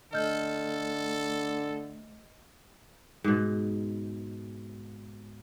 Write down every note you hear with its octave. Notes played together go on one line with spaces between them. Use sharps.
D3 A3 A4 D#5 F6 G6
G#2 B2